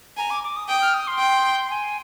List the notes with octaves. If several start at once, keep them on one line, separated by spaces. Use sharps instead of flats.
G#5 A#5
D6
D6
D#6
G5 D#6
F6
D#6
C6
G5
G#5